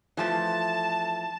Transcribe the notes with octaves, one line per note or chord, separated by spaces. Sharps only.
E3 F3 A3 A5